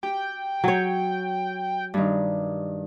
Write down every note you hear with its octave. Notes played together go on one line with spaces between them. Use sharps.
G4 G5
F#3 C#5
G2 D#3